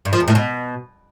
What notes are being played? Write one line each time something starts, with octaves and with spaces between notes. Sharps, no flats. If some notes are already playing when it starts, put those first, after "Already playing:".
G2
F3
E2
A2
B2